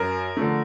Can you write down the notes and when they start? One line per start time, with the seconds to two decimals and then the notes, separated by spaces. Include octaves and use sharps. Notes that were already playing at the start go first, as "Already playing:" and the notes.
Already playing: F#2 A#4
0.37 D3 F3 A3